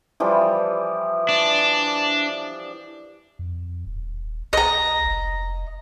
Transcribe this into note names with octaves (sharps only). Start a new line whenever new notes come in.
E3 F3 G3
D4
F2
D#1
B1 D#5 A#5
F1